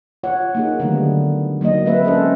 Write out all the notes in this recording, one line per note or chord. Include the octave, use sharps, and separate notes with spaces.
F4 C#5 F#5
A#3 D#4 G#4
D3 D#3 F#3 G3 A3 B3
F#3 A#3 D#4 D#5
G#3 A#3 C4 B4 E5
C#4 A4 C5 D#5